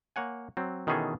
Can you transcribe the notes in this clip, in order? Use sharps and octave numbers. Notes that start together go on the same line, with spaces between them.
A#3 C#5 F#5 G#5
F#3 C4
B2 D#3 E3 C#4 G#4 A4